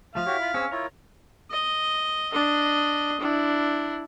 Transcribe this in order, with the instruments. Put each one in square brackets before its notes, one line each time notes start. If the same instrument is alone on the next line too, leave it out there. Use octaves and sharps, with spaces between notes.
[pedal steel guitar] F3 A3 [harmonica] F5
[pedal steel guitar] E4 [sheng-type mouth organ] F#4 G4 C#5
[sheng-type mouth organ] F4 B5
[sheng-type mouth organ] C4 G#4 E6 [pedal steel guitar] C#4
[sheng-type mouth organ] E4 F4 C#5 [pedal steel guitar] A#4
[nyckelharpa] D#5
D4 D#5
D4 E4